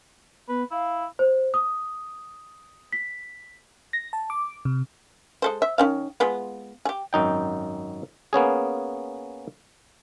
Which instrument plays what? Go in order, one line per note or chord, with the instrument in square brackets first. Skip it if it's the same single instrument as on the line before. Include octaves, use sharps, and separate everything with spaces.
[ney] B3 [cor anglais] B4
[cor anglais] E4 [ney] F5
[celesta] C5
D#6
B6
[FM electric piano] A#6
A5
D6
C3
[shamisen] G#3 A4 C5
E5
D#3 C#4 F5
G#3 B3 F4
G4 G#4
[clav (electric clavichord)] G#1 F#2 D#4 G5
A#3 B3 C#4 G#4